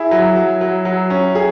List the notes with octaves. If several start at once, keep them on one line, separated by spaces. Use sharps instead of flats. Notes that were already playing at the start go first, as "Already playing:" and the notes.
Already playing: E4 G#4
F#3
F#3
F#3
F#3
C#4
G#4